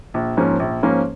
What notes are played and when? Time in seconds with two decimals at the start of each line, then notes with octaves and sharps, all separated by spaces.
0.14 A#1
0.37 G#2 F3 A#3 C#4
0.60 A#1
0.83 G#2 F3 A#3 C#4